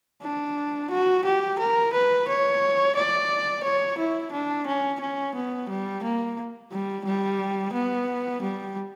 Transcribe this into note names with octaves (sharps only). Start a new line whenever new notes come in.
D4
F#4
G4
A#4
B4
C#5
D5
C#5
E4
D4
C#4
C#4
B3
G3
A#3
G3
G3
B3
G3